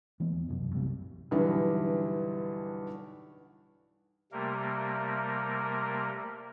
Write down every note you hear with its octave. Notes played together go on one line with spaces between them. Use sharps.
E3 G#3 B3
E2
F1 C2 F#2 B2
B1 C3 G3
B1 G2 D3 E3
C3 G3 A3 A#3 A#4